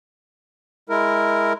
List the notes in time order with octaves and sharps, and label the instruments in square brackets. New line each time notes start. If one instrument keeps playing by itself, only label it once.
[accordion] G#3 E4 A#4